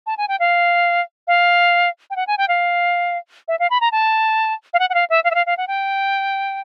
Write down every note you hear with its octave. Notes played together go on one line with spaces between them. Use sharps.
A5
G#5
G5
F5
F5
G5
F#5
G#5
G5
F5
E5
F5
B5
A#5
A5
F5
F#5
F#5
F5
E5
F5
E5
F5
F5
F#5
G5